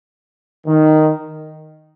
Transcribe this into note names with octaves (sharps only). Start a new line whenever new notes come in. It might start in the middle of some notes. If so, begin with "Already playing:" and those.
D#3